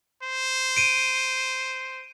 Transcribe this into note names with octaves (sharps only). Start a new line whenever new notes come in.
C5
D7 D#7